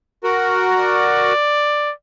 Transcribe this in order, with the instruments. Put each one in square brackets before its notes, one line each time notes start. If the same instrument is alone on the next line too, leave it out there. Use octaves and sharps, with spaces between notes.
[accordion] F#4 A#4
[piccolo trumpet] D5